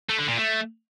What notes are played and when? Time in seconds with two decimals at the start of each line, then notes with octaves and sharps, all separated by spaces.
0.09 A3
0.19 D3
0.28 A#2
0.37 A3